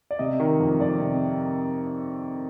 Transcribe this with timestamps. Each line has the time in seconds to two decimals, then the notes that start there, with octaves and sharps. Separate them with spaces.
0.11 D5
0.19 C3 D#5
0.40 D#3
0.60 F2
0.80 F2 D5
1.00 C3